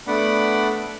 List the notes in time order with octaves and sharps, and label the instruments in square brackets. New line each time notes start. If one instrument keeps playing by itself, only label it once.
[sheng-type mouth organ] A3 B3 D4 D5 F#5 B5